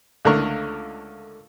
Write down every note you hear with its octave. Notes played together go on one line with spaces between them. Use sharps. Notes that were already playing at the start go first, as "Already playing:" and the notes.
C#2 D3 A3 A#4 C#6